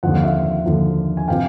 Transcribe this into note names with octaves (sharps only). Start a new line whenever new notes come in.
D#2 D3 F3 F#5
F5
E5 F#5
D#2 D3 F3
G#5
C3 F3 F5 G5